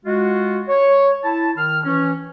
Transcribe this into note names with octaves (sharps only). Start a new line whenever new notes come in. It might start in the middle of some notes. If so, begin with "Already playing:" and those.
G#3 F4 F#4
C#5
E4 A5
D#3 F6
E3 C#4